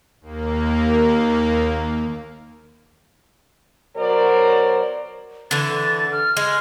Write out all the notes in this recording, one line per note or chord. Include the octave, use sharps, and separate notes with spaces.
D#2 A#3
B2 F#3 A#4 C5 D5
D3 E3 A6
F6
G#3